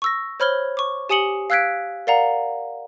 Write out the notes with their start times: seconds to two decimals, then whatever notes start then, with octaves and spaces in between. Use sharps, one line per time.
0.02 C#6 E6 A#6
0.40 C5 C#5 B5 F6 G#6 G7
0.77 C#6 D6
1.09 G4 G#5 D#6 C#7 F#7 G7
1.50 F5 E6 F#6 G#6 B6 D7
2.07 A#4 D5 F5 F#5 A#5